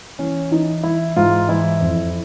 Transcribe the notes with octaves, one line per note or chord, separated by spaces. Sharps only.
E3 C#4
E3 D#4
E3 E4
G#2 F4
E3 E4
F2